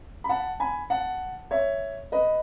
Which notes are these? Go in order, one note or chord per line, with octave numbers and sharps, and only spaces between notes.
B5
F#5 A5
G#5 B5
F#5 A5
C#5 E5
B4 D#5